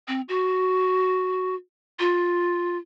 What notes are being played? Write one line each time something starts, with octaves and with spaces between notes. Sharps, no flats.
C4
F#4
F4